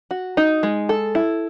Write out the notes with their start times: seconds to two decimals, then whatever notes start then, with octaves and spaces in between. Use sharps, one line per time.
0.11 F#4
0.37 D#4
0.63 G#3
0.89 A4
1.15 E4